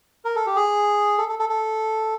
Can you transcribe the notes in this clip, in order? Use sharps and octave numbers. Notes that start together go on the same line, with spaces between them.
A#4
A4
G4
G#4
A4
A4
A4
A4